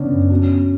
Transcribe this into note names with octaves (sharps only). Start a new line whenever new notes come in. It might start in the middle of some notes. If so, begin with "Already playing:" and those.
Already playing: C#3 B3 C#4 D4
F#2
C#4 F#4
B3